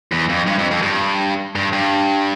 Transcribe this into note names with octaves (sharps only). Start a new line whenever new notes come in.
E2
F2
G2
F2
F2
G2
G2
G2